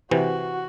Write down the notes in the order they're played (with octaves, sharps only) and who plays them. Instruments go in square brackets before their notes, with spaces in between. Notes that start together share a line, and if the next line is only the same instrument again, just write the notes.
[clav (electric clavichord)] C3 E3 [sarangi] F#4